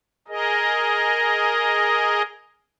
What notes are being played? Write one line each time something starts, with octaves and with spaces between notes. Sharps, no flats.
G#4 A#4 D#5